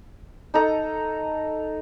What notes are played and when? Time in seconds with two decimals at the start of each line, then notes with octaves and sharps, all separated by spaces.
0.54 D#4 A4 A#5